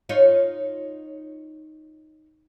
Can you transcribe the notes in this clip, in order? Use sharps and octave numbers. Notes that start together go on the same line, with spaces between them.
D#4 F4 C#5